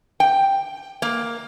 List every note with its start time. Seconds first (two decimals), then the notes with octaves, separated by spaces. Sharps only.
0.20 G5
1.02 A#3